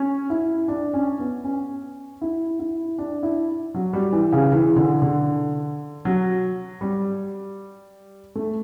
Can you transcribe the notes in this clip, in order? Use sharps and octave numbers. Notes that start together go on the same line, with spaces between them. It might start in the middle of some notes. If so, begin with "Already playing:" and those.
Already playing: C#4
E4
D4
C#4
B3
C#4
E4
E4
D4
E4
F#3
G3
E3
C#3
E3
D3
D3
F#3
G3
A3